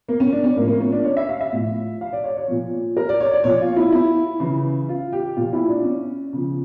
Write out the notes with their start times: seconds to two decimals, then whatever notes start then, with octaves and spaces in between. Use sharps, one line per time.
0.09 A#3
0.20 C#4
0.33 D4
0.44 C#4
0.56 A2 F3 A#3
0.68 A#3
0.81 C#4
0.92 D4
1.05 C#5
1.17 E5
1.29 F5
1.41 E5
1.53 A2 F3
2.01 F5
2.13 D5
2.24 C#5
2.37 C#5
2.48 A#2 F3
2.97 A#4
3.09 D5
3.20 C#5
3.33 D5
3.44 A#2 F3 C#5
3.61 F4
3.76 E4
3.92 E4
4.40 C#3 E3
4.89 F4
5.13 G4
5.36 A#2 F3 F4
5.53 E4
5.69 D4
5.84 C#4
6.33 C#3 F3